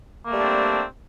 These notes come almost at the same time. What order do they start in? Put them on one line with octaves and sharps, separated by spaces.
A#3 A3 G3 D4 C4